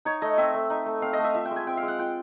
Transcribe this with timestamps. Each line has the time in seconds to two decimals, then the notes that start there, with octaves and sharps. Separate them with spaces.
0.05 D#4 C#5
0.22 A3 D#5
0.38 C4 E5
0.54 A3
0.70 D#4
0.86 A3
1.02 C4 F5
1.13 D#5
1.19 A3
1.24 E5
1.34 F4 E5
1.45 G5
1.51 G#3
1.56 G#5
1.67 C4 G5
1.77 F5
1.83 G#3
1.88 F#5
1.99 F4 G5